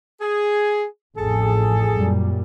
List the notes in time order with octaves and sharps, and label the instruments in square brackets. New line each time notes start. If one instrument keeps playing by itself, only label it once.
[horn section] G#4
[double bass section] A1 F2 [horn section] G#4 A4
[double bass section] F#2 A#2 G3